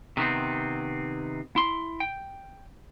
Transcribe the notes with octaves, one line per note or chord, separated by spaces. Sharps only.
C3 D#3 B3 C4
E4 C6
G5